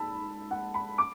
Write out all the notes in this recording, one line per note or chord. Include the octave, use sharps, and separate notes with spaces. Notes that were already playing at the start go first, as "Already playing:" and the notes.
Already playing: G#2 A5 B5 E6
F#5
B5
D6